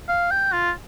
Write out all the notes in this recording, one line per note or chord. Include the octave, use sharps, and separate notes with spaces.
F5
G5
F4